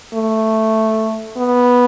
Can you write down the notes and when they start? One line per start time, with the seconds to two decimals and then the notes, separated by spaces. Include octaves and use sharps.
0.14 A3
1.38 B3